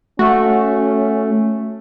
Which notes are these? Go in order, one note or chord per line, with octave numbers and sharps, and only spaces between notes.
A3 C#4 F#4